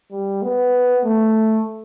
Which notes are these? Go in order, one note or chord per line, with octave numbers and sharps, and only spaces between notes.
G3
B3
A3